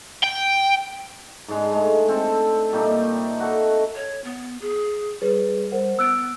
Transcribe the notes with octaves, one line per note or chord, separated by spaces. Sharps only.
G5
G#2 G#3 D4
G#3 A3
C4 A4 A5
A#2 G3 A3 D#4
F#4 A4
C#5
B3
G#4
G3 G#4 B4 C#5
A#4 C5 F#5
B3 E6 F#6 D7